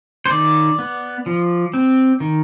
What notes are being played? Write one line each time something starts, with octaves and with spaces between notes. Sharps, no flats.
C5
D#3 D5
B3
F3
C4
D#3